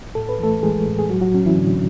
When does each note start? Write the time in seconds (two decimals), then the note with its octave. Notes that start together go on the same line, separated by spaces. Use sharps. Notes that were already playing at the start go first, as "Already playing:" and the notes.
0.15 A2 A4
0.29 B4
0.39 E3 A3 A4
0.63 E3 G#3 G#4
0.86 A2
0.99 G#4
1.10 F#3 F#4
1.21 F#3 F#4
1.34 F#3 C#4
1.46 E3 E4
1.57 A2 D3 D4